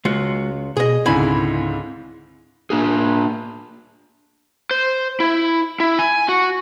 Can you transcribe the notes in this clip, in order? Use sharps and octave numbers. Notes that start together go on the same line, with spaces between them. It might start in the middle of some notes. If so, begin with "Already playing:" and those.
C#2 G#3 F4 F#4
B2 G#4 D#5
C#2 G#2 D3 C4 E4 G#5 B5
A#3 D4 G#4
C5
E4
E4
G#5
F#4